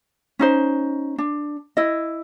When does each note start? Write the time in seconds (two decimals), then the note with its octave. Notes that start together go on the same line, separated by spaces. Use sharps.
0.39 C#4 D#4 C5
1.18 D4
1.77 E4 D#5